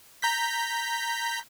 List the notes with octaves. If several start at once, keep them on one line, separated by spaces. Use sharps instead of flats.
A#5 G6 B6